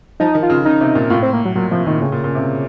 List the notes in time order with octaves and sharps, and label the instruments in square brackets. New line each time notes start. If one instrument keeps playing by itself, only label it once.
[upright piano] F3 [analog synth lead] D#4
[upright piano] D#3
[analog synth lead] F4
[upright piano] C#3
[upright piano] C#3 [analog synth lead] D#4
[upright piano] C3
A#2
[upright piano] A2 [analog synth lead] F4
[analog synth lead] C4
A#3
F#3
[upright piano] A#2 [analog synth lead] F#3
[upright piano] C3 [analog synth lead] F3
[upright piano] A#2 [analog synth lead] D#3
[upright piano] A2 [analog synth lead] C#3
[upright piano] A#2
A#2
C3